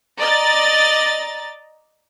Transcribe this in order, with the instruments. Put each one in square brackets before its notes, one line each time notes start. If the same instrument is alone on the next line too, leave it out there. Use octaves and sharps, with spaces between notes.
[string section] D5 D#5 A#5 A6